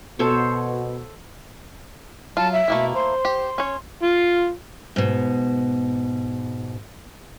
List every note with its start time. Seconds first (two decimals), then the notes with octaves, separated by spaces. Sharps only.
0.19 B2 A4 C5 C#5
2.37 F#3 F4 A5
2.53 E5
2.68 B2 A3 A#3 E4
2.95 C5 C6
3.25 G4
3.58 C#4 C#5
4.03 F4
4.96 G#2 B2